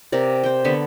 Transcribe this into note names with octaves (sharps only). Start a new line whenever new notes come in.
C3 A#4 D5
C5 G5
D3 B3 A5 B5